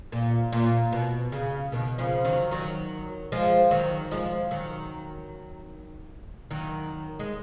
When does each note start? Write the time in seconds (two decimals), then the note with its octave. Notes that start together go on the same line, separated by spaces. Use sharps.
0.12 A#2
0.53 A#2
0.93 B2
1.32 C#3
1.72 B2 D#3
1.98 C#3 F3
2.25 D#3 F#3
2.51 D#3 F#3
3.32 F3 G#3
3.71 D#3 F#3
4.11 F3 G#3
4.51 D#3 F#3
6.51 D#3 F#3
7.19 G#3